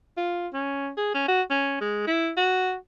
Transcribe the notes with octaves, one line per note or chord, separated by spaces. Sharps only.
F4
C#4
G#4
C#4
F#4
C#4
G#3
E4
F#4